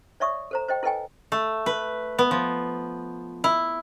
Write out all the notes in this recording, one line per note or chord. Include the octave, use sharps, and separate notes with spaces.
C#5 D5 E5 C#6 D#6
A4 C5 A#5
C5 D#5 G5
E4 A4 B4 D#5 G5 G#5
A3
B4
B3
F3
E4